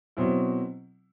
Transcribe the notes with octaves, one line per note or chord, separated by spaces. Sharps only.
B2 F#3 C4 E4